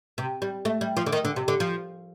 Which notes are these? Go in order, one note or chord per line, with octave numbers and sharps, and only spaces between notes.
C3
G3
A3
G3
F3
D3
D#3
D3
C3
D3
F3